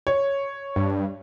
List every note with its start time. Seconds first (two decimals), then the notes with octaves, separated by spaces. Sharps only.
0.07 C#5
0.76 G2